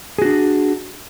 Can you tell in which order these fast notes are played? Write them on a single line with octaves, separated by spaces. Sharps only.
G#4 F#4 D4